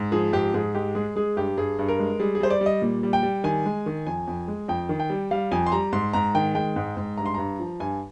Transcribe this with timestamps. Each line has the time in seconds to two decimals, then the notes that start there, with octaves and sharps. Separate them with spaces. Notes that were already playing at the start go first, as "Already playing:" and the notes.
Already playing: G#2
0.12 F3 G#4
0.33 G#2 G4
0.54 G#2 G#4
0.75 G#3 G4
0.95 G#3 G#4
1.16 G#3 G#4
1.37 G2 G4
1.57 G2 G#4
1.79 G2
1.88 A#4
1.99 G#3
2.20 G3 G#4
2.35 G#4
2.40 G3 C5
2.50 D5
2.61 G3
2.66 D#5
2.82 A#2
3.03 G3
3.13 G5
3.23 G3
3.44 D#3 G#5
3.65 G#3
3.86 D#3
4.07 F2 G#5
4.27 F2
4.48 G#3
4.68 F2 G5
4.89 D#3
5.00 G5
5.10 G3
5.31 G3 F5
5.51 F2 G#5
5.66 C6
5.72 G3 A#5
5.92 G#2 C6
6.13 G#2 A#5
6.35 D#3 G5
6.55 G#3 G5
6.76 G#2
6.97 G#2
7.17 G2 A#5
7.26 C6
7.34 G2 A#5
7.60 F3
7.80 G2 G#5